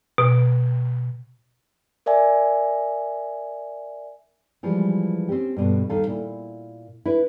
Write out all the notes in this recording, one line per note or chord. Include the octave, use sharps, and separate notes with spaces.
B2
A#4 D5 E5 G#5
E3 F3 G3 G#3
C4 C#4 G4
G2 B2 D3
D#2 D#3 A4 F5
A#2 E4
E4 B4